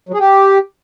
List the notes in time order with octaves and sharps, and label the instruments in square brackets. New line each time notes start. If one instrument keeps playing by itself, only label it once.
[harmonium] F#3
G#4
G4